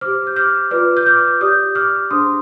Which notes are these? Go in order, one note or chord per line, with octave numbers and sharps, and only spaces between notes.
G4 C5 D6 F6
G6
D6 F6
F4 B4 D5 D6 F6
G6
D6 F6
G4 D5 D#6 G6
D6 F6
D4 G#4 C5 C6 D#6